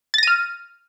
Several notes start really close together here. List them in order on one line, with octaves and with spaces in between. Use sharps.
A6 A#6 D#7 F6